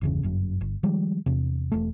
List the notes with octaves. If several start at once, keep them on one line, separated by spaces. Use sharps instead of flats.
G1 E2 C#3
G1 F#2
G1
D#3 F3 G3 G#3
E2 C3
E1 A3